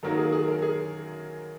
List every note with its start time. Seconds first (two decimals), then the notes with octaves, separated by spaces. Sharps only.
0.03 F#2 D#3 F#3 A#3 A#4
0.18 G#4
0.32 G#4
0.47 A#4
0.62 G#4